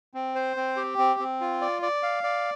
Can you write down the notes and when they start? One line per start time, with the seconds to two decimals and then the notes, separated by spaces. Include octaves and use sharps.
0.14 C4
0.35 C5
0.57 C4
0.76 G4
0.98 C4
1.20 C4
1.41 F4
1.61 D5
1.82 D5
2.03 F5
2.23 D5